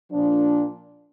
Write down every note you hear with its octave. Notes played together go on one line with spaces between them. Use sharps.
A#2 F3 D4